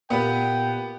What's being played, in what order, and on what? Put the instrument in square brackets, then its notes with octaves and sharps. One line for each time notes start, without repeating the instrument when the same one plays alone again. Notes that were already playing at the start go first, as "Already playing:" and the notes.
[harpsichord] A#2 [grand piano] B3 G4 B4 [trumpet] G5